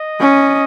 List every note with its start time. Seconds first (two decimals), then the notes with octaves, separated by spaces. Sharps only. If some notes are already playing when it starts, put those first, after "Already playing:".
Already playing: D#5
0.20 C#4